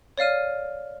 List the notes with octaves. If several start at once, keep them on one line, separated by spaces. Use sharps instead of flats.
C#5 D5 F5 F6 D#7